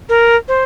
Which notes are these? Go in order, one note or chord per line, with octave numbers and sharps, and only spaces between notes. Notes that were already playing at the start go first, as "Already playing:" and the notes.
A#4
C5